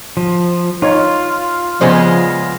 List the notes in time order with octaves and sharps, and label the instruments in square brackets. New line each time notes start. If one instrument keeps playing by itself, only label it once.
[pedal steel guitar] F3
[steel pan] D#4 C#5 [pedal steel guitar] F4
[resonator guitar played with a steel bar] C#3 G#3 B3 [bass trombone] F3 [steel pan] G#4 C5 D5